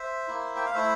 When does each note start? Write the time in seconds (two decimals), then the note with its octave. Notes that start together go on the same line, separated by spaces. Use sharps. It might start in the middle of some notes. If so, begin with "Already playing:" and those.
Already playing: C5 E5
0.28 A#3 E4
0.56 G5
0.66 F5
0.74 A3 E4 C5 E5